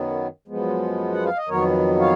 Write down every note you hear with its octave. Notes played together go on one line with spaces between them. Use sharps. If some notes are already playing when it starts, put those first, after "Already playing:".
Already playing: F#2 D#3 F#3 B3
F#2 F3 G#3 B3
F#5
F5
D#5
F2 D#3 F#3 B3 A#4 C#5
C#5 F5